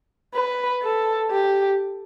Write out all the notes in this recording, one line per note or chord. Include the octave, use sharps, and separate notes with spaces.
B4
A4
G4